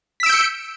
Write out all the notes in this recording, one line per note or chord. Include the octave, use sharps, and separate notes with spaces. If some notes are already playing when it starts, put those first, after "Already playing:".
E6 G6 B6 C#7 D7